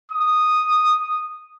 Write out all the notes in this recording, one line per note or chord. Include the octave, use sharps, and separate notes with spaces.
D#6